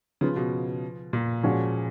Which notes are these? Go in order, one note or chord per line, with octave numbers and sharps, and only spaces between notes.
C#3 F3 B3 F4 G#4 B4
B2
A#2
A#2 F3 G#3 C#4 F#4